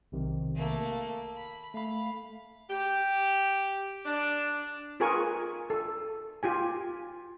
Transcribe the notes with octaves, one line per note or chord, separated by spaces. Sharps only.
B1 C3 D#3
A3 A#3
F5
B5
A3 F5 B5
G4
D4
F4 G#4 A#4 B4 G#5 C#6
A4
F4 G4 G#5